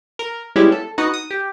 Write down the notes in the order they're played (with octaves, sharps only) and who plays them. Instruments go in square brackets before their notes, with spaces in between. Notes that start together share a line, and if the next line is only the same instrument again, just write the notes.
[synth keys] A#4
G3 G#3 B3 C#4 E4 G4
A4
B3 D#4 F#4 D#5 F#5
D#6
G4